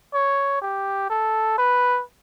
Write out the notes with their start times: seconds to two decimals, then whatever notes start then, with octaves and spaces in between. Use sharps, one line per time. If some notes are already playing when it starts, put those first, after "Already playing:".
0.14 C#5
0.62 G4
1.10 A4
1.58 B4